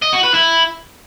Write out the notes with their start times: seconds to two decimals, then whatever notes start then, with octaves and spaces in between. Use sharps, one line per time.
0.02 D#5
0.13 F#4
0.23 B4
0.34 E4